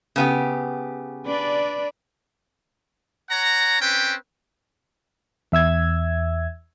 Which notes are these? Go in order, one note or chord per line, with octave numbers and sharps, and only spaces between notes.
C#3 B3 G4
D4 B4 D5
C#5 F#5 A#5
C4 C#4 B4 G5
E2 E5 E6 G#6